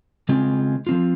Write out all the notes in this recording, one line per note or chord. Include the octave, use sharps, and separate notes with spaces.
C#3 G#3 C4 F4
F3 C4 F4